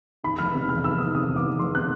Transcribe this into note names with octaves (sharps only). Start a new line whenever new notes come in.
D#3 B5
F1 F6
C3
E2 F6
D#3 E6
F1 D#6
C3 D#6
E2
D6
D#3
F1 C6
C3 F#6